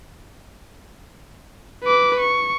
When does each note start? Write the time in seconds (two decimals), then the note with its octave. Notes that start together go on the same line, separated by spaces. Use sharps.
1.84 B4 D6
2.20 C#6